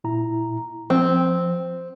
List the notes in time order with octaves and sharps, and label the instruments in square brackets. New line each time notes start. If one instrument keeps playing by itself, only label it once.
[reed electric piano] A#2 E4 A#5
[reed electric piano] F3 [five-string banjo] C4